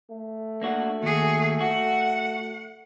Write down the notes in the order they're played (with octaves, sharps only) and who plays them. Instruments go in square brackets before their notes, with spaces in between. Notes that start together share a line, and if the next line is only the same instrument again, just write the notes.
[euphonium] A3
[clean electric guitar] A#3 D4 F#4
[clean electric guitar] D#2 [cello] F#4 G#4
[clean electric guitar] F#4 [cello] F#5